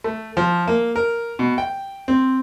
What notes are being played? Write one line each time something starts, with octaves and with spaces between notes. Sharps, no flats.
A3
F3
A#3
A#4
B2
G5
C4